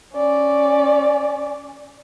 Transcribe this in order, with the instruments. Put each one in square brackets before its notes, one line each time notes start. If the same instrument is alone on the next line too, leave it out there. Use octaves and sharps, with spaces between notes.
[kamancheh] C#4 D5